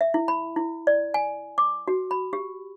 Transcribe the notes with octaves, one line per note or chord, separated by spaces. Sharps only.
E5
E4
B5
E4
D5
G#5
D6
F#4
B5
G4